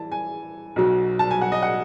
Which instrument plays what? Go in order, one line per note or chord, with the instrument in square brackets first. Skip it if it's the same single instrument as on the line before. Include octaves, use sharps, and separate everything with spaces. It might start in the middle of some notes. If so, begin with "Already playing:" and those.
Already playing: [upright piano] E3 A5
G#5
B1 B2 F#3
A5
G#5
F#5
D#5
F#5